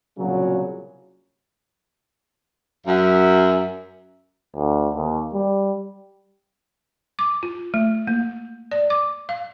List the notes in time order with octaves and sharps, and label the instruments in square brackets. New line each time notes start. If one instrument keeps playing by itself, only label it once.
[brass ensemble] C2 A#2 C#3 F#3
[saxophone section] F#2 [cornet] E5
[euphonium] D2
D#2
G3
[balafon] D6
F4
A3
A#3
D5
D6
F5